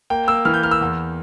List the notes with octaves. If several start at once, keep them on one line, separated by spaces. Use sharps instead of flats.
A#3 G5
A#3 E6
E3 F6
G6
A#3 F6
E6
E2